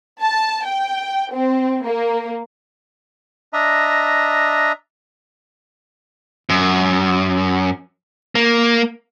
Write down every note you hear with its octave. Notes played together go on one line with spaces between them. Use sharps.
A5
G5
C4
A#3
D4 D#5 E5 A#5
F#2
A#3